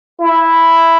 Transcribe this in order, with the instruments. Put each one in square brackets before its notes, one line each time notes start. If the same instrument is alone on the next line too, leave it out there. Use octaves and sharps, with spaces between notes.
[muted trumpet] E4